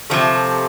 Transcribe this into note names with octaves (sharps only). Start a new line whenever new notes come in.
C3 F3 A3